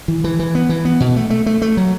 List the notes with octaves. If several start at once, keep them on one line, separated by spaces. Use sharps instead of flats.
E3
E3
E3
B3
E3
B3
B2
A3
A3
A3
A3
F#3